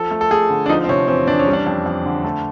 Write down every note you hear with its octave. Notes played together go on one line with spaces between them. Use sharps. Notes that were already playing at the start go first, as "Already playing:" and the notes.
Already playing: F3 A4
A3
A4
A3 G#4
D3
D4
F3 D#4
C4
C3 C#4
E2 C4
E2 D4
C#4
G3
D4
F2
F2
D3
A3